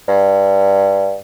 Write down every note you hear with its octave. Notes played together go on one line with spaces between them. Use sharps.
G2